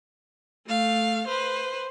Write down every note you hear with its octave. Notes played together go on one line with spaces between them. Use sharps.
A3 F5
B4 C5